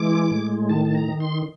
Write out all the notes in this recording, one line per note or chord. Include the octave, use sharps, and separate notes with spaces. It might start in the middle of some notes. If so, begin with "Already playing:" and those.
Already playing: E3 G#3 D6
A2
D#3 A5
A5
A#5
D#3
C6